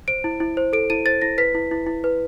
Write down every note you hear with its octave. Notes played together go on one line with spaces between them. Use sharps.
C5 D7
E4
E4
C5
A4 D7
E4 D#7
C5 A6
E4 A#6
B4 B6
E4
E4
E4
B4